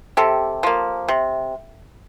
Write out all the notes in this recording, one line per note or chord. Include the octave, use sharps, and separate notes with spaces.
C3 G4 A4
F3 A#3
C3